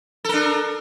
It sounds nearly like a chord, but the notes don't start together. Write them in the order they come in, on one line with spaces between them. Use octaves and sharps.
A4 A#4 D4